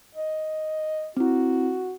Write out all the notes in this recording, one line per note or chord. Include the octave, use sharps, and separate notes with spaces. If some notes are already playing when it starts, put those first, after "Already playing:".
D#5
C4 E4 F#4